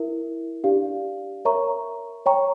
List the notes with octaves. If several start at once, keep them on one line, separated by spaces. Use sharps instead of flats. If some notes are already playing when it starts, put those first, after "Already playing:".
Already playing: E4 A#4 E5
D4 G4 D5 F5
A#4 C#5 E5 A#5 C#6
C#5 G5 A#5 C#6